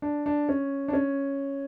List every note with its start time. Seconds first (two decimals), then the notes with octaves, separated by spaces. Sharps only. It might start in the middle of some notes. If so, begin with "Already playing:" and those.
0.02 D4
0.26 D4
0.49 C#4
0.88 D4
0.93 C#4